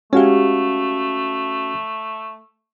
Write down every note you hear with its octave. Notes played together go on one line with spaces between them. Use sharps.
G#3 A3 C#4 F#4 G4 F5